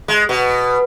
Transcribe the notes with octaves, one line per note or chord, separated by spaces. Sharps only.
G#3
B2